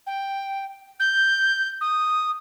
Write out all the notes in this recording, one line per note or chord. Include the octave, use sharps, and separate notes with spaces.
G5
G6
D#6